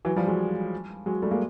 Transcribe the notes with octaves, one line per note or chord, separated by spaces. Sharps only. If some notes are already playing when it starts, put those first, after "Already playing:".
E3 F#3
F3 G3
F#3 G#3
F#3 G#3
G3 A3
G#3 A#3